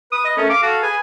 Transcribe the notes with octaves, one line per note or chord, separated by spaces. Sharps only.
B4 D#6
D#5
A3 C#4 A4 A#4
F5 D6
F#4 A4 F5
G#4 B4 G#5